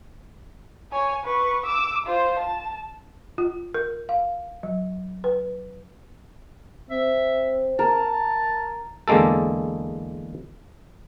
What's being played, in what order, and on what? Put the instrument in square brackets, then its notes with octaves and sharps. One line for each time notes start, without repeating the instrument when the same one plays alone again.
[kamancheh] C#5 G#5
B4 C#6
D6 E6
F4 C5
A5
[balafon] F4
A#4
F5
F#3
B4
[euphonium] C4 [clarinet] E5
[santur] A#4 [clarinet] A5
[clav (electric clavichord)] E2 D3 G#3 A#3 A4